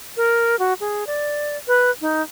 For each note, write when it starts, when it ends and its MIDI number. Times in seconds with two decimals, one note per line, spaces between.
0.17 0.58 70
0.59 0.73 66
0.80 1.07 68
1.07 1.57 74
1.67 1.91 71
2.01 2.22 63